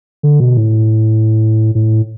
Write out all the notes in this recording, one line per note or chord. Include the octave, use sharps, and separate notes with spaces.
D3
B2
A2
A2